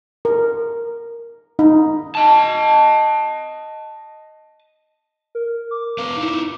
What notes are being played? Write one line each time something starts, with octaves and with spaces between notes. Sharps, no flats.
A#4
D#4
D#5 A5
A#4
D6
B3 B4 F5
D#4 E4